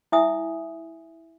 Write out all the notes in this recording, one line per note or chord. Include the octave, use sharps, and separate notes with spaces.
E4 E5 G#5 D#6